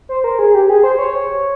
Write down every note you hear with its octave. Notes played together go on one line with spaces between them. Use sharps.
C5
A#4
G#4
G4
G#4
C5
C#5